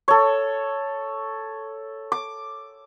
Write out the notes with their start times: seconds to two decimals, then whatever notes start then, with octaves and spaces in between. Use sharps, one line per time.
0.08 A4 C#5
2.12 D6